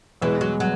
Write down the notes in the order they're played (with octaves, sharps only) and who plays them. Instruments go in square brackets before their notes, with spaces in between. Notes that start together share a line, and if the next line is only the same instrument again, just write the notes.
[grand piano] E2 B2 G#3 [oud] E3
[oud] F#3
F#3